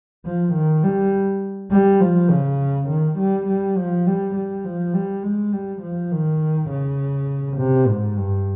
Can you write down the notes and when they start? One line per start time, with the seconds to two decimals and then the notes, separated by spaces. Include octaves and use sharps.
0.25 F3
0.54 D#3
0.83 G3
1.71 G3
2.01 F3
2.30 C#3
2.88 D#3
3.18 G3
3.47 G3
3.77 F3
4.06 G3
4.35 G3
4.65 F3
4.94 G3
5.23 G#3
5.52 G3
5.82 F3
6.12 D#3
6.70 C#3
7.58 C3
7.87 G#2
8.17 G2